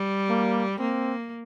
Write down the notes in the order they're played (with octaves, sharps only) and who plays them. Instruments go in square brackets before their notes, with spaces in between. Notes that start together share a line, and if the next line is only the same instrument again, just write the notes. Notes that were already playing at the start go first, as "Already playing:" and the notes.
Already playing: [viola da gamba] G3
[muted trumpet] A#3
[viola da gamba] A#3 [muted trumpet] C4